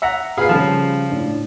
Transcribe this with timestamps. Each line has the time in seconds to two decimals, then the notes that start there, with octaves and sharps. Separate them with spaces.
0.02 E5 F#5 A#5
0.37 A#2 G#4 B4 F5 B5 C7
0.49 C#3 F3 G3 A4
1.10 A2 D4